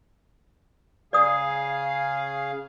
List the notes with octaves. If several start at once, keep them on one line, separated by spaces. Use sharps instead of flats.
C#3 G#4 D5 F5 D#6